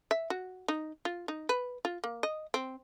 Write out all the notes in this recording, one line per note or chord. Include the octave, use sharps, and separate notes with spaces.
E5
F#4
D#4
F4
D#4
B4
F4
A#3
D#5
C4